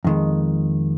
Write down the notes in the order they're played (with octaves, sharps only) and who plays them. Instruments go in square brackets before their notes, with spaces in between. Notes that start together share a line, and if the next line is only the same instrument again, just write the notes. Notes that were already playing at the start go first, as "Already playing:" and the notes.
[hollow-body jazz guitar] F2 D#3 G#3